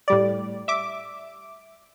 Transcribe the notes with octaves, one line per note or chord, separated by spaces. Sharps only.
A2 G3 D5
E5 D6